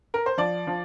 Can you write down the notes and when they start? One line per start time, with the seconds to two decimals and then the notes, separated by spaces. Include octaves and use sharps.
0.14 A#4
0.26 C5
0.38 F3 D5
0.67 F3